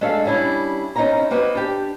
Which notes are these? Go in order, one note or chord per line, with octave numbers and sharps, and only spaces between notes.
G#3 A3 D4 A4 E5 F5
G3 C#4 D4 E4
C4 C#4 D#4 E4 A#4 A#5
A#3 C4 F#4 B4 D#5
D4 G4